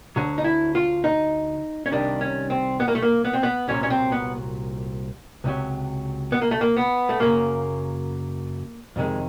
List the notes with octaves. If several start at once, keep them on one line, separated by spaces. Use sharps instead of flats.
D2 D3 F#3
D#4
E4
F4
D#4
C#4
C2 C3 D#3 G3 D4
C#4
C4
B3
A#3
A3
A#3
B3
C4
B3
C2 A#2 F#3 C#4
C#4
C4
B3
C#2 C3 D#3 F#3
B3
A#3
A3
A#3
B3
A3
F#2 C#3 F#3 A#3
F2 C3 D#3 G#3